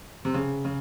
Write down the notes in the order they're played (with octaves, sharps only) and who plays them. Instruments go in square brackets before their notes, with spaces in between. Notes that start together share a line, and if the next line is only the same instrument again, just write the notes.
[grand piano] C3
C#3
C#3